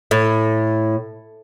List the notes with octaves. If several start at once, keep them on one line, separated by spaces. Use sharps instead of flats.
A2